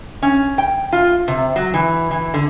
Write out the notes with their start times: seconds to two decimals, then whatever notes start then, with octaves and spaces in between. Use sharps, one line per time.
0.22 C#4
0.58 G5
0.93 F4
1.28 C3
1.56 F#3
1.74 E3
2.11 E3
2.34 D3